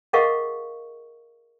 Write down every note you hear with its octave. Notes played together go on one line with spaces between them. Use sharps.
G#4 A#4 D#5 F5 F#5 C#6